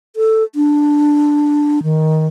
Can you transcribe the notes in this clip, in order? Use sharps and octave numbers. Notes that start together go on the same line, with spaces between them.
A4
D4
D#3